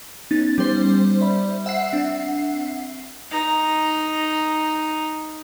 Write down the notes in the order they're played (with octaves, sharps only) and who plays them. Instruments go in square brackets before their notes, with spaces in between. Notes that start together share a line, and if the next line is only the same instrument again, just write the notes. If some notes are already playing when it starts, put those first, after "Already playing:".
[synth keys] B3 C#4 D#4 [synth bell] A6
[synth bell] G3 C5
[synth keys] D5 E5 B5
[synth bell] E5 F#5 C7 [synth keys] G5
[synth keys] C4 D4
[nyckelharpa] D#4 A#5